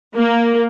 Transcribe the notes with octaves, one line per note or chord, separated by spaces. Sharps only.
A#3